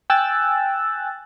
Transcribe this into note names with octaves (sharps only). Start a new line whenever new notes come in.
G5 G#5 E6 F#6 A6